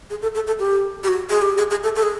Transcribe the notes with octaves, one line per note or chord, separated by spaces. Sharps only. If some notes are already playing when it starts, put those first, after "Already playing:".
G#4
A4
A4
A4
G4
G4
F#4
G#4
G4
G#4
G#4
A4
A4
G#4